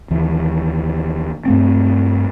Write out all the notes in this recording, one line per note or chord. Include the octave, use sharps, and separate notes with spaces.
D#2 E3
G2 A3 C4